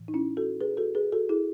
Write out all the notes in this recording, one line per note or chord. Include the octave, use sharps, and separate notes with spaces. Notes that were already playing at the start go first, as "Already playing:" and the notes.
Already playing: A2 E3
D#4
C#4 E4
F#4 A4
G#4 B4
F#4 A4
G#4 B4
F#4 A4
E4 G#4